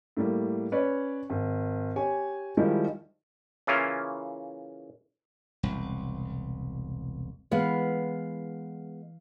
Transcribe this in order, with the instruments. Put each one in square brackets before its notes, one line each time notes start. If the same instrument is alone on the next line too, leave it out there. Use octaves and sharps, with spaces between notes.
[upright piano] A2 G3 A#3
C#4 B4 C#5 D5
G#1
G4 C#5 G#5
D#3 F3 G3 G#3 D#4 E4
[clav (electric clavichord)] C#3 E3 A#3 C#4 E4 F4
[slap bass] E1 C2
[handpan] E3 F5 [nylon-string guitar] G#3 B3